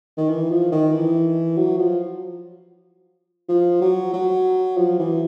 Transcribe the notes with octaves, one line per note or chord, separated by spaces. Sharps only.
D#3
E3
F3
D#3
E3
F#3
F3
F3
F#3
F#3
F3
E3